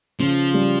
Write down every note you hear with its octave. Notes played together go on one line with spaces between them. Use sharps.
C#3 F3
G3